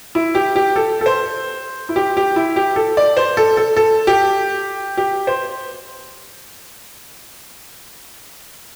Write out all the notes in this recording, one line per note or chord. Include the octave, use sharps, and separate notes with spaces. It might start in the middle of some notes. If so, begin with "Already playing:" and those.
E4
G4
G4
A4
A4
C5
E4
G4
G4
E4
G4
A4
D5
C5
A4
A4
A4
G4
G4
C5